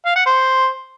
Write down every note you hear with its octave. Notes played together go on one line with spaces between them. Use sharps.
F5
F#5
C5